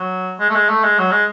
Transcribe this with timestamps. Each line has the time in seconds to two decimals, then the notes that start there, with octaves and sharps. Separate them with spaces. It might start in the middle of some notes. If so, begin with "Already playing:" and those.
Already playing: F#3
0.40 G#3
0.50 A3
0.55 G#3
0.69 A3
0.84 G#3
0.98 F#3
1.12 G#3